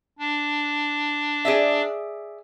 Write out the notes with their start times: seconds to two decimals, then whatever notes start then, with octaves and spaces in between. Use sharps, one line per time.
0.19 D4
1.45 G#4 D5 E5